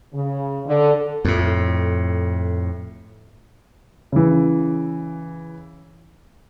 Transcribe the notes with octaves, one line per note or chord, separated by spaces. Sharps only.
C#3
D3
F2 A2
C#3 E3